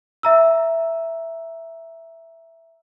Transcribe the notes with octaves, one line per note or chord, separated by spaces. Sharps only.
E5 A#5 E6